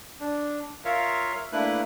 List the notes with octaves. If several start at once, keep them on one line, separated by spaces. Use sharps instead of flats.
D4
F4 A#4 C#5 E5 F5
A3 A#3 D4 E4 B4 F#6